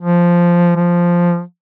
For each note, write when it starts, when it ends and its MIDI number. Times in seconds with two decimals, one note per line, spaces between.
0.01 0.71 53
0.76 1.41 53